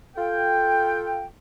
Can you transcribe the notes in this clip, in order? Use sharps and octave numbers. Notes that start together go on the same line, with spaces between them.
F4 A4 G5